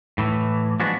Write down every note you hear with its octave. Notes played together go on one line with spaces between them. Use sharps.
A2 E3
F3 G#3 B3 D4 F#4